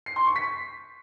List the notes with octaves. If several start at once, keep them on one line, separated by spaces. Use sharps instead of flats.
C7
C6
C#6
B6